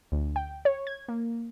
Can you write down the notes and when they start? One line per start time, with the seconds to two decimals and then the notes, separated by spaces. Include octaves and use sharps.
0.12 D2
0.36 G5
0.65 C#5
0.87 G#6
1.08 A#3